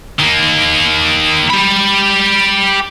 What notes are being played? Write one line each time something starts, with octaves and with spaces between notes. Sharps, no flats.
D#3 A#3
G4 B5